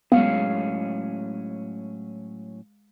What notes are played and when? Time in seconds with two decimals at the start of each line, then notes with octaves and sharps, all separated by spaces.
0.12 A2 F#3 G#3 B3 C#4 F5